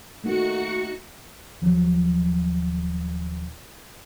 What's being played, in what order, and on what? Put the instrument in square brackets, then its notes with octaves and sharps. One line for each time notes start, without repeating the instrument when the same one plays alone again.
[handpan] A3 A#3 D#4 [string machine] F#4 C#7
[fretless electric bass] D#1 F3 F#3